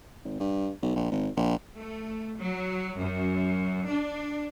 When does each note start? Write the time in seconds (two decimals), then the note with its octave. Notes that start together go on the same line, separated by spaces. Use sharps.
0.25 G#1
0.40 G2
0.82 B1
0.96 A#1
1.11 G#1
1.37 A#1
1.77 A3
2.42 F#3
3.00 F#2
3.88 D4